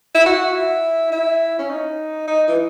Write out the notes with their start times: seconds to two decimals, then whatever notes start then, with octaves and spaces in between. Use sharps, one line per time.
0.15 E4
0.26 F#4
0.54 E4
1.12 E4
1.59 C#4
1.70 D#4
2.27 D#4
2.48 E3